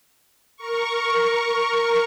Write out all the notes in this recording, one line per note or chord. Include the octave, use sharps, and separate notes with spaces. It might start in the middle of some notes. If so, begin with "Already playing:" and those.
A#4 C#6